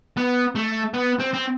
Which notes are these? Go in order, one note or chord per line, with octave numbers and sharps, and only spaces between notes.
B3
A3
B3
C4
C4